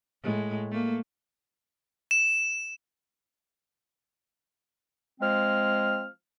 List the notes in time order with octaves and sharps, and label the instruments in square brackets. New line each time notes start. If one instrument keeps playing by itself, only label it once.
[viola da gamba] A2 G#3
A3 A#3
[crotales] E7
[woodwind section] F3 G#3 C4 F6